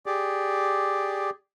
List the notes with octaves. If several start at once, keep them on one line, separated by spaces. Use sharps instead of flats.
G4 G#4 D5